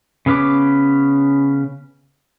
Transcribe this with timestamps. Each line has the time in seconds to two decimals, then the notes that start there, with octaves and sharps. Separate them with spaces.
0.26 C#3 B3 C#4 B4 D6